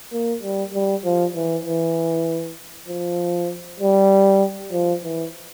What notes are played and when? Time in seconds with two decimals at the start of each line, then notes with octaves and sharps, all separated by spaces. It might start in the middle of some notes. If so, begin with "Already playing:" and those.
0.12 A#3
0.42 G3
0.74 G3
1.04 F3
1.35 E3
1.65 E3
2.88 F3
3.80 G3
4.72 F3
5.03 E3